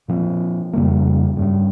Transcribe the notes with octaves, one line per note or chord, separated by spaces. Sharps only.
A#2 F3 C4
F2 C#3 G3 A#3
G2 G3 C#4